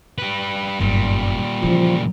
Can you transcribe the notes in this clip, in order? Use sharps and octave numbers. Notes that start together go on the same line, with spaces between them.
G3 B4
G1 F#2 A#2 G3
C#3 E3 F3